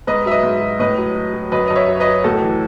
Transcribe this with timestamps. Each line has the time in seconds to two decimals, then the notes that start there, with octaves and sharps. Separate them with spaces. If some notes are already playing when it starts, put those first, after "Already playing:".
0.07 G#2 B4 D#5
0.26 F#3 E5
0.31 B4 D#5
0.43 G#2
0.61 F#3
0.79 A2 B4 D#5
0.98 F#3
1.15 F#3
1.34 F#3
1.52 F#2 B4 D#5
1.68 F#2 D#5
1.76 C#5 E5
1.88 F#3
2.00 B4 D#5
2.07 F#3
2.24 A2 F#4 A4
2.42 E3